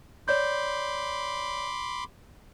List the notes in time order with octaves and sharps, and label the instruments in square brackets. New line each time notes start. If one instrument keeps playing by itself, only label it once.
[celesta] C#5 D5 G6 [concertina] B5 C6 D6